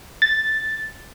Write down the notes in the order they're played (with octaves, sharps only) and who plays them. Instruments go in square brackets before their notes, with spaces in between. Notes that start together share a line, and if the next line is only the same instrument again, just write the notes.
[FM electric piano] A6